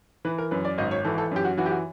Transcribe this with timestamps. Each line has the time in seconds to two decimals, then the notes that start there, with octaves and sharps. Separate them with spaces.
0.25 E3 B4
0.38 A#4
0.51 F#2 B4
0.65 D5
0.78 G#1 D#5
0.91 C#5
1.05 E3 A4
1.18 A4
1.31 F#2 G4
1.45 F#4
1.57 E3 F#4
1.66 G4
1.71 F#4